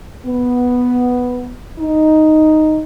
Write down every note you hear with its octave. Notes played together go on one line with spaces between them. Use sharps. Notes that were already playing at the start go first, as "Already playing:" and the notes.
B3
D#4